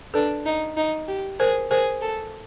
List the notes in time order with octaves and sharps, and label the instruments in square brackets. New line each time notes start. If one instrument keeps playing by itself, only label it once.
[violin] D4 [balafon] A4 B4
[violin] D#4
D#4
G4
[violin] G#4 [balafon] A#4 C5
[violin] G#4 [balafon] A#4 C5
[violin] A4